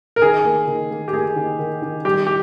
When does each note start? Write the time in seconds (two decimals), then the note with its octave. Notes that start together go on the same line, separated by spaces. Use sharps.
0.16 A#4
0.22 D#3 G#4
0.45 A#3
0.68 D#3
0.91 A#3
1.08 G4
1.13 A#3 G#4
1.36 D#3
1.59 D#3
1.82 D#3
2.05 G3 G4
2.27 G4